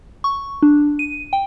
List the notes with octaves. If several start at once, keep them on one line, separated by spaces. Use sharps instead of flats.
C#6
D4
D#7
G5